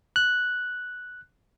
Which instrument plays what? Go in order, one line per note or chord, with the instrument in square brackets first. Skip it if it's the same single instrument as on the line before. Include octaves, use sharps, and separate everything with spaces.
[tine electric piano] F#6